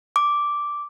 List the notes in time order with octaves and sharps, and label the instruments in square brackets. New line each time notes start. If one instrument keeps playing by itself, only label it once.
[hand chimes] D6